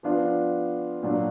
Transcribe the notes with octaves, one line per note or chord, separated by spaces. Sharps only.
F3 B3 D4 F4
A#2 F#3 D4